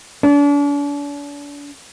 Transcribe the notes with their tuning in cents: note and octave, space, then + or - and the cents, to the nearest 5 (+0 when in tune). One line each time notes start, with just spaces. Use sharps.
D4 -40